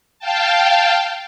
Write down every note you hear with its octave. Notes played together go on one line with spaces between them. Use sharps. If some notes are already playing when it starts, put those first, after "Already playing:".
F5 G5 A5